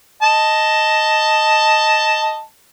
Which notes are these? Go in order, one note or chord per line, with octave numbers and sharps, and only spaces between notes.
D#5 A5